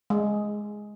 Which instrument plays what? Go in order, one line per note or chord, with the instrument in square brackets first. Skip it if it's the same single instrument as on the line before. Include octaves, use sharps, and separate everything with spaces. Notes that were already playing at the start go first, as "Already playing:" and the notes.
[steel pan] G#3